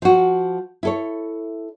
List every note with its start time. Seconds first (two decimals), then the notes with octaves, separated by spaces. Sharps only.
0.02 F3 F#4
0.83 E4 A4 C#5